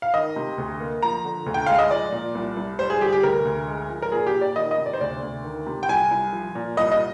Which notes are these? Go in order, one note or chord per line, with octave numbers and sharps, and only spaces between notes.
F5
D#3 D#5
C3
D2
A#3
F3 A#5
D3
D2
G5
G#3 F5
D#5
F3 D5
A#2
C2
C2
G3 C5
G#4
D3 G4
G#4
G4
D2 A#4
D2
G#3
F3
A#4
A#2 G#4
G4
A#2
D5
D#3 D#5
D#5
C3
D5
C5
D2 D5
D2
D#3
C3
G5
C2 G#5
C2
F3
A#2
C2 D#5
D#5